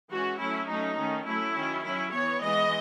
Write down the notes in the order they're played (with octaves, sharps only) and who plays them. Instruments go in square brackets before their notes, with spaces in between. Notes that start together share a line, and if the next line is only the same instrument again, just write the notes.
[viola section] E3 G#3 C#4 F#4
F#3 A3 C#4 E4
F#3 A3 C#4 D#4
D#3 A3 C#4
F#3 A3 C#4 E4
D#3 F#3 C#4
F#3 C#4 E4
E3 B3 C#5
E3 G#3 B3 D#5